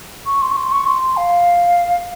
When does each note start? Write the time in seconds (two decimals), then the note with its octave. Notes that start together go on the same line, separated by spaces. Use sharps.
0.26 C#6
0.41 C6
0.51 C#6
0.57 C6
0.71 C#6
0.86 C6
1.16 F5